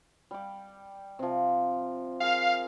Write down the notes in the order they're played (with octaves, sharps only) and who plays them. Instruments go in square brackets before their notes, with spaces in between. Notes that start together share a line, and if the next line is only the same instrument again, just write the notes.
[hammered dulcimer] G3 D6
C3 F3
[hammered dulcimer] G#4 A#4 [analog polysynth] F5